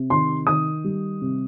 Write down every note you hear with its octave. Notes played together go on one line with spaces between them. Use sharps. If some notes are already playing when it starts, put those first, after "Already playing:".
Already playing: C3
D#3 C6
D#3 D#6
G3
C3